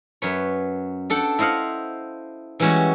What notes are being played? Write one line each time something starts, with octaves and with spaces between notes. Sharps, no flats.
F#2 B4 C#5
D4 A4 F#5 G5
E4 C5 D#5 F5 F#5
E3 G3 G#3 C#4 E4 F#4